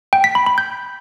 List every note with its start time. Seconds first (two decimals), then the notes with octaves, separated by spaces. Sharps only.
0.13 G5
0.24 B6
0.35 B5
0.46 B5
0.58 G6